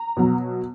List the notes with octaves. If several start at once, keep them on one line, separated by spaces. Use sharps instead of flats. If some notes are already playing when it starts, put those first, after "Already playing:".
Already playing: A#5
B2 F#3